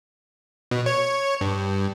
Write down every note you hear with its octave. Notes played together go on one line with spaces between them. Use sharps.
B2
C#5
G2